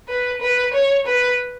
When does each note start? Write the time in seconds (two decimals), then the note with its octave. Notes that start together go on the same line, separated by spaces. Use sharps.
0.08 B4
0.41 B4
0.73 C#5
1.06 B4